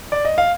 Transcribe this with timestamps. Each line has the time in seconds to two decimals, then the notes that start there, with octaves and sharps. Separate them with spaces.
0.12 D5
0.25 D#5
0.38 F5